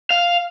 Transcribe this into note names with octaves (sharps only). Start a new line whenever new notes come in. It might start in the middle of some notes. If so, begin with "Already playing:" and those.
F5